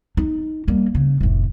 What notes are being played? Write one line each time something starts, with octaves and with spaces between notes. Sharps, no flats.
D#4
G3 A#3
C#3
F1 A2